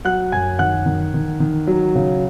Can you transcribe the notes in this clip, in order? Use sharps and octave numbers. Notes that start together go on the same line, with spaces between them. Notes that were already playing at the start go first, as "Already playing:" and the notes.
F#3 F#5 F#6
F#2 G#5 G#6
D#3 F#5 F#6
D#3
D#3
D#3
F#3
C#3